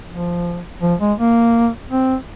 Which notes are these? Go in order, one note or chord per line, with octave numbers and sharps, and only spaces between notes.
F3
F3
G#3
A#3
C4